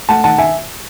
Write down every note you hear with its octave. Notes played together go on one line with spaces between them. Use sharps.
A3 F#5 A5
D#3 F#5 A5
E5 G#5